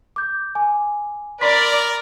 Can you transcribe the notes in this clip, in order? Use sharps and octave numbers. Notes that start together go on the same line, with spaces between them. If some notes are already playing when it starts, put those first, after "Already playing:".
D6 G6
G#5 D6
A#4 D5 B5 C6 B6